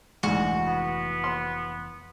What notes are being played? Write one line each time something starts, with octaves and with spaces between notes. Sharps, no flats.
F1 D2 G#2 E3 F#4
B3
C6